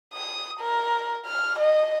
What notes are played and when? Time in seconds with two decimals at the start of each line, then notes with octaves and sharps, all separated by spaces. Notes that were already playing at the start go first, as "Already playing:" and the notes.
0.13 D#6
0.60 A#4
1.26 F6
1.58 D#5